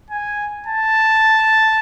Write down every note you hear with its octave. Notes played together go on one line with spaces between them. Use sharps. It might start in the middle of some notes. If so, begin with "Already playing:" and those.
G#5
A5